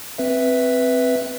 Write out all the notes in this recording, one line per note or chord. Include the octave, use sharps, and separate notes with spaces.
C4 B4 E5